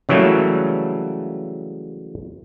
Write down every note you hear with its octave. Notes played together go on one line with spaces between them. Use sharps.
C#3 E3 F#3 G3 A3 A#3